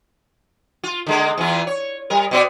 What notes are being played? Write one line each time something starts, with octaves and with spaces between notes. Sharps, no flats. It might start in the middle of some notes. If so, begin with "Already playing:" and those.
F4
D3 G#3 A#3
E2 E3 F4
C#5
G3 A#4
B2 B3 D5